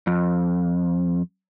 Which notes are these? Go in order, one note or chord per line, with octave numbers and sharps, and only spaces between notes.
F2